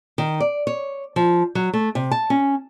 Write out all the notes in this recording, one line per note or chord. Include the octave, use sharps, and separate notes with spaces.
D#3
D5
C#5
F3
F#3
A3
C3
A5
C#4